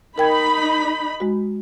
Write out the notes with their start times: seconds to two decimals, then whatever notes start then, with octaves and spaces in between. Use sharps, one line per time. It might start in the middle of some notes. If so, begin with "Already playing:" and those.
0.18 D#4 A#4 G5 B5 G#6
1.20 G#3 F#4